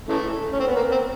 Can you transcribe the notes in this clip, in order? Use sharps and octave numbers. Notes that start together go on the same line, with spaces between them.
C#3 E3 A3
C#4
C4
B3
A#3
C4